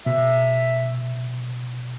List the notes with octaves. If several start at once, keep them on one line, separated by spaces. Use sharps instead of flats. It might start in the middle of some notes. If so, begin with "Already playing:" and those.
B2 E5